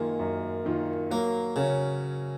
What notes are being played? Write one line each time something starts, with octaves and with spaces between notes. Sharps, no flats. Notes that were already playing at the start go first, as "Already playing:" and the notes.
Already playing: F#2 D#3 G#3 A#3 F4
F#2
D#3 A#3 F4
F#3 A#3
C#3 C#4 F#4 A#4 C#5